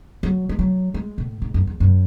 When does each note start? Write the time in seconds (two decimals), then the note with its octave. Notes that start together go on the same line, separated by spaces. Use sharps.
0.23 F#3
0.49 G#3
0.59 F#3
0.94 G#3
1.18 A2
1.42 G#2
1.54 F#2
1.67 E2
1.80 F#2